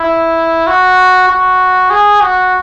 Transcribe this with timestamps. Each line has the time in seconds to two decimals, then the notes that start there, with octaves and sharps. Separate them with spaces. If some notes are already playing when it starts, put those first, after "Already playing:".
Already playing: E4
0.67 F#4
1.29 F#4
1.90 G#4
2.21 F#4